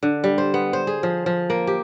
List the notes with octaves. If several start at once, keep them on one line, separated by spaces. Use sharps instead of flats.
D3
G3
C5
B3
C5
G#4
F3
F3
A#3
G4